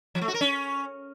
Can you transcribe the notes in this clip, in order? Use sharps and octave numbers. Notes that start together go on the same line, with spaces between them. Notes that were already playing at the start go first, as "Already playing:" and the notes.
F3
A3
F#4
A#4
C#4